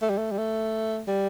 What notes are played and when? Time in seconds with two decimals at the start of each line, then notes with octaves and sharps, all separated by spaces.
0.02 A3
0.10 G3
0.18 A3
0.31 G3
0.38 A3
1.08 G3